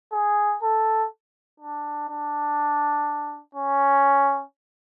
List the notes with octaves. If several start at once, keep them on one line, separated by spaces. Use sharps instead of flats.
G#4
A4
D4
D4
C#4